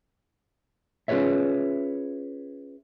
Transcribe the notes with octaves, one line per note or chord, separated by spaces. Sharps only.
C#4 F4 G#4 B4 C#5 E5